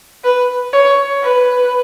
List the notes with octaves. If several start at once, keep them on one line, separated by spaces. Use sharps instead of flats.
B4
C#5
B4